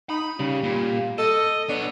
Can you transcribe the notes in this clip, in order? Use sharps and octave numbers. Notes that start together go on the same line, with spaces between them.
D#4 B5
C#3 G3
A#2
A4 D#5
B3 D4 C#5